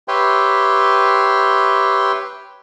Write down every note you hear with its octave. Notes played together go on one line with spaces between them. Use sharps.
G4 B4 C#5 E5 G5 C6